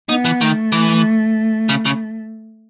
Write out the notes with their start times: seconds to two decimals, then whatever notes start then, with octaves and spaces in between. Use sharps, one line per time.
0.09 B3 D#4
0.25 E3
0.41 D#3 A3
0.72 E3
1.69 C#3
1.85 C#3